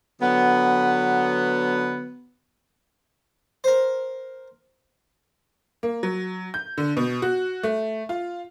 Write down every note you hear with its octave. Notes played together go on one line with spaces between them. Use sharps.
D3 F#3 B3
A#4 C5
A#3
F#3
G6
D3
B2
F#4
A3
F4